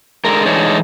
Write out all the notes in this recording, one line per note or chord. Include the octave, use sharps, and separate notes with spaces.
D3 G#3 A#4
E3 G#3 A3 D4 D#4 C#5